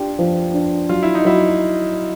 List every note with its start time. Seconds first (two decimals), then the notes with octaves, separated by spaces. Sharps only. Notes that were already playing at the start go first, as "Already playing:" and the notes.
Already playing: D4 F4 G4
0.19 F3
0.54 D4
0.89 F#3 F4
1.03 E4
1.15 D#4
1.25 F#3 E4